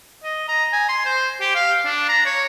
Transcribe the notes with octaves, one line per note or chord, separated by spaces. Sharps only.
D#5
A#5
G#5
C6
C5
G4
F5
D4
A#5
C#5